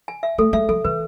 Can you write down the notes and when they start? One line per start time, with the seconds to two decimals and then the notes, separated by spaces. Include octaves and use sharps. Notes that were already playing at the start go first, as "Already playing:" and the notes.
0.08 G#5
0.23 E5
0.38 A3 A4
0.53 G#3 E5
0.69 F3 A4
0.84 E3 B4